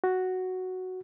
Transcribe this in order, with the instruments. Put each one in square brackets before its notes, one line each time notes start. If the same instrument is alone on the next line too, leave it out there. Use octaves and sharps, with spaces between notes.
[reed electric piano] F#4